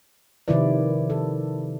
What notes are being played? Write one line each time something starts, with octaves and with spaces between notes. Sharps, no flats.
C3 D#3 F3 E4 B4 D5
A4